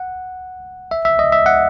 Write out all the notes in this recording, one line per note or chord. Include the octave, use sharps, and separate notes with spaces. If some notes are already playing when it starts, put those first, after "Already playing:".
Already playing: F#5
E5
E5
D#5
E5
F#5